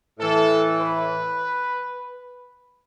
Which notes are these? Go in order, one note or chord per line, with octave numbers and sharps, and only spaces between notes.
A2 E3 A4
B4